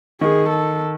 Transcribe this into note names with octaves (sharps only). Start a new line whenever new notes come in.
D#3 G#4
A4